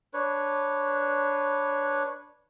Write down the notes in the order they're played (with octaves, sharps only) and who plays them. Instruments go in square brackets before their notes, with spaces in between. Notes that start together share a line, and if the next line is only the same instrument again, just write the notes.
[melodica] D4 B4 C#5